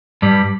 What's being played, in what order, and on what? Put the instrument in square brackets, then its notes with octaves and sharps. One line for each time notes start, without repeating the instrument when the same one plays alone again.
[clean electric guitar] G2 G3